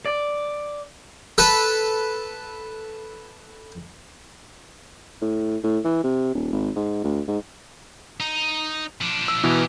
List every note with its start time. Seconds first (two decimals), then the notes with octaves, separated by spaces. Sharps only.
0.06 D5
1.38 A4 B4
5.22 A2
5.64 A2
5.85 E3
6.04 C3
6.34 D#1
6.52 G#1
6.76 G#2
7.04 D2
7.28 G#2
8.20 D#4
9.01 F3 D4
9.28 E6
9.43 B2 E3 B3 G4 A#4